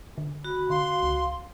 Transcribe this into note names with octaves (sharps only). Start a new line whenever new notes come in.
D3
F#4 B5
D3 F5 C6
C#2